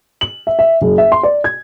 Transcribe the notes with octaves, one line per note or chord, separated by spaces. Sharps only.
F#7
E5
E5
F#1
E5
C6
D5
G#6